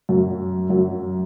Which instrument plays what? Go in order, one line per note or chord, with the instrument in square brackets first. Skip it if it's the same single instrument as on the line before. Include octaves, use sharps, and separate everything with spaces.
[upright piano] F#2 F#3
F#2 F#3